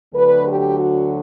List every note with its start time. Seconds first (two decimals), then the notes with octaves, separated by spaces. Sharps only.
0.13 D2 D3 F#3 B4
0.46 G4
0.78 F#4